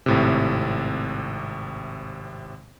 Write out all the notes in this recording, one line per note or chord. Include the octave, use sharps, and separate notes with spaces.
G#1 A2 C3